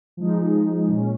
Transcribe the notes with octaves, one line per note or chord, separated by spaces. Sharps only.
F3 G#3 D#4
A#2 G#3 C#4